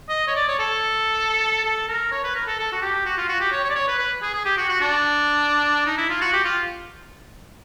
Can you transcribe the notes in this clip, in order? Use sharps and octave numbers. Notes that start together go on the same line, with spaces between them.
D#5
C#5
D5
C#5
A4
A4
A#4
C#5
B4
A#4
A4
A4
F#4
G4
F#4
F4
F#4
G4
C#5
C#5
D5
C#5
B4
B4
G#4
G#4
G4
F#4
F#4
D4
D#4
E4
F4
F#4
G4
F4